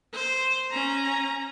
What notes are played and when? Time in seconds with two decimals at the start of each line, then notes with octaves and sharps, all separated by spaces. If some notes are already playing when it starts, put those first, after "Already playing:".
0.14 C5
0.71 C#4 A#5